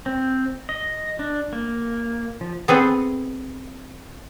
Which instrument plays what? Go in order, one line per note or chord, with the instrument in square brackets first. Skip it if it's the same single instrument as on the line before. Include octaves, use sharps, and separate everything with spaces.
[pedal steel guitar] C4
D#5
D4
A#3
F3
[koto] B3 C4 G#4 A4